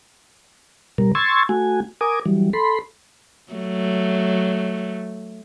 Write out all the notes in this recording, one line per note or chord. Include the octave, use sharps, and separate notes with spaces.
B2 G3 A#4
C6 C#6 E6 G#6 A6
A3 F#4 G#5
A#4 G#5 D6 D#6
E3 F#3 G3
A4 B5 C6
F#3 A3